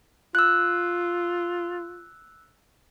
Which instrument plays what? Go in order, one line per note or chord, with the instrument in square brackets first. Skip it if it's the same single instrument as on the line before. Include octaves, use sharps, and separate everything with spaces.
[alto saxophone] F4 [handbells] E6 F#6